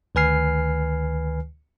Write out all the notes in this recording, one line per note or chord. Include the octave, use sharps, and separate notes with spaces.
D2 D#3 B4 G#5 F6 C7